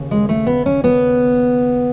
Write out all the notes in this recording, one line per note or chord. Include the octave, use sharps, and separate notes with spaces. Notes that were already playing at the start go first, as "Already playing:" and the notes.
Already playing: D#2 C#3
G#3
A3
B3
C#4
B3